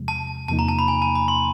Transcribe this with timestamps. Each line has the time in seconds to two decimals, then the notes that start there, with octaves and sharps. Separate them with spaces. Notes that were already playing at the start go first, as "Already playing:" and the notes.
Already playing: E2 C3 F3 G#3
0.08 A5
0.48 E2 C3 F3 A#3 D#4 A5
0.59 A#5
0.68 A5
0.79 B5
0.88 G#5
1.02 A5
1.15 B5
1.28 C6